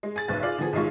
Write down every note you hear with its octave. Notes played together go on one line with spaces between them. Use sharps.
G#3
G#4 A6
F#1 B1 B4
F4 G#4 D5 F5
D3 E3 F3 B3 G#4
B1 G#2 D#3 G#3 F4 C#6